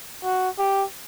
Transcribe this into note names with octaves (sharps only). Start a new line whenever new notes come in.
F#4
G4